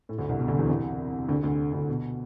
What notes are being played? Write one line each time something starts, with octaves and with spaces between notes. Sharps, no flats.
A2
D2 D3
C2 C3
B2
D2 D3
E2 E3
C2 C3
D2 D3
D2 D3
D2 D3
B2